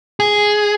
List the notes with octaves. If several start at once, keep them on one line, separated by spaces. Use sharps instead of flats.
G#4